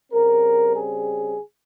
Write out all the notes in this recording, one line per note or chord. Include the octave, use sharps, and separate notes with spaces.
C#3 G3 C4 A#4
G#4